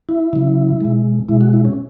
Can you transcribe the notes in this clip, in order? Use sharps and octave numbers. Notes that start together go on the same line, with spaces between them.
E4
C#3 F#3
B2 G#3
B2 G#3 E4
F#4
E4
C#4